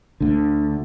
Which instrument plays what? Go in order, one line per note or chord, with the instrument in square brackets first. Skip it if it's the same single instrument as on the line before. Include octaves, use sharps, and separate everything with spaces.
[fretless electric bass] D2 D3